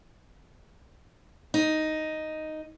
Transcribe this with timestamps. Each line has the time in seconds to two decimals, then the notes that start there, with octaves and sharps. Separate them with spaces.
1.54 D#4